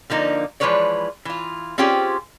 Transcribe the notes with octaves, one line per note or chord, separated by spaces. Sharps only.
D3 F3 A#3 D#4
E3 F3 G#3 B4 C#5 D5
E3 F4
C4 C#4 F4 G4 G#4 C5